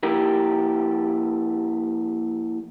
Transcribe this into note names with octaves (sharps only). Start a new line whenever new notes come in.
F3 A#3 E4 G4 A4 A#4